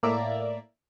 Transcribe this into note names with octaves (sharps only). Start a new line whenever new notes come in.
A2 A#3 D5 E5 A#5